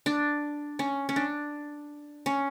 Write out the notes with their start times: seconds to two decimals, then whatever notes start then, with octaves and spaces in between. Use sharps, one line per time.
0.06 D4
0.79 C#4
1.09 C#4
1.16 D4
2.26 C#4